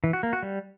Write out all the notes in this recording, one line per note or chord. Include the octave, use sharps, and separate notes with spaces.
E3
F#4
A#3
F#4
G3